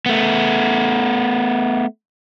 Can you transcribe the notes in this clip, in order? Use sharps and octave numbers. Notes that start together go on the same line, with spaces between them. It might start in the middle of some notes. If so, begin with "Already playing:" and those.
A3 B3